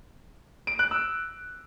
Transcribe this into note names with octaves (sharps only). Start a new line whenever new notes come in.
D7
F#6
E6